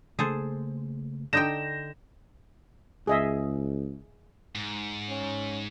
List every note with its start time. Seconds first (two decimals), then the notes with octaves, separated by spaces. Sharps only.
0.19 C#3 A3 A#3 G#4 A4 C5
1.33 D3 D#4 G5 G6 A#6 E7
3.07 C#2 G#4 D#5 E5
4.55 G#2
5.09 C#4